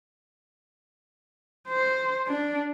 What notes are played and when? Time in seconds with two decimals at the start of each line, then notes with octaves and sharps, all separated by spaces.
1.68 C5
2.27 D4